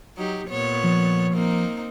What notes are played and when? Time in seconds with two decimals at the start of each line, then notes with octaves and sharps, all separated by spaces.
0.16 F#3 D#4 G4
0.48 A#2 B3 C#5
0.84 F3
1.33 A#3 C4 D#4